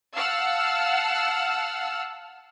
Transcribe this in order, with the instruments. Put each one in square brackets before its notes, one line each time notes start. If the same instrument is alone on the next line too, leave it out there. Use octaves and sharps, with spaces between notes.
[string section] F5 F#5 A5 E6 F6